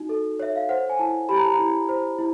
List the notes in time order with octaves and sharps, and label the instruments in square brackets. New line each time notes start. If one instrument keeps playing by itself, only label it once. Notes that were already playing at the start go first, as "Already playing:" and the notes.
Already playing: [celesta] D#4 F#4
A4
C#5 E5
F5
C5 F#5
G#5
E4 A5
G4 B5
A#5
A5
A#5
E4
C5
E4